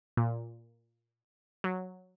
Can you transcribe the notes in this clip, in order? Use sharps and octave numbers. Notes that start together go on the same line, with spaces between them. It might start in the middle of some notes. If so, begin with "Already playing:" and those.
A#2
F#3